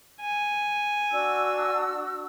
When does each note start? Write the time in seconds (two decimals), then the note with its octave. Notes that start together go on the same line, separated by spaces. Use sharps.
0.21 G#5
1.11 D4 F#4 E6